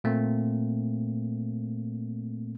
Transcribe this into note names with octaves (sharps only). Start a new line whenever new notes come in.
A#2 A3 A#3 C4